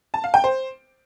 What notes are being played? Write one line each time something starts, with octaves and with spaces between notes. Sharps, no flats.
A5
F5
G5
C5